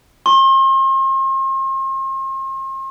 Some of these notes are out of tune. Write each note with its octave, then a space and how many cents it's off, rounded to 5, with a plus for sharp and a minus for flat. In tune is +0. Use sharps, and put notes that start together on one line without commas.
C6 +40